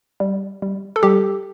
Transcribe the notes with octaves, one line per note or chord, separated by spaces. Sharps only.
G3
G3
A4
G3 G4